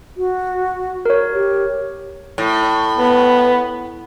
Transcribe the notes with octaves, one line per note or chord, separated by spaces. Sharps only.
F#4
A#4 C#5
G4
A2
B3